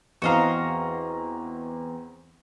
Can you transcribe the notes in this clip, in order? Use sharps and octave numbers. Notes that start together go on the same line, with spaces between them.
E2 C4 F#4 D#5 F5 A#5